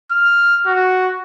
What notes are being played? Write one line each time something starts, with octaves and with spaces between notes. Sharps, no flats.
F6
F#4